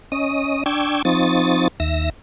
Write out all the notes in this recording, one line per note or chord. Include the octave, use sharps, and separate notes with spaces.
C#4 D#5 D#6
D4 G5 C#6 D6 E6 G#6
F3 C4 D#4 C#6 D#6 A6
D#2 E5 A#6